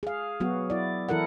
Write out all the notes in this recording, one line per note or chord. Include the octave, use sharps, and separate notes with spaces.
G#4 F5
F#3 B3 F#4
E4 D5
E3 E4 A4 A#4 F#5